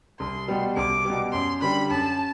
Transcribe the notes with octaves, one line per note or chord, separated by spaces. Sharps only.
C2 C6
B2 G3
C2 D6
B2 G3
F#2 C6
D3 G3 B5
F#2 A5